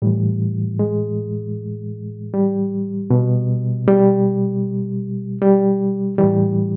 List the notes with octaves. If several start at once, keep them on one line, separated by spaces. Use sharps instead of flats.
A2 E3 G3
G#3
G3
B2
G3
G3
A2 E3 G3